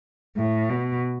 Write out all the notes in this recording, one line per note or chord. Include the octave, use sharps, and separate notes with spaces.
A2
B2